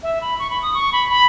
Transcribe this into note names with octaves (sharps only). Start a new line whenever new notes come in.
E5
B5
C#6
B5
D#6
C#6
B5
B5